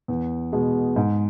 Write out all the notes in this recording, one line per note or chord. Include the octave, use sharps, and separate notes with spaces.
E2
B2 G#3
G#2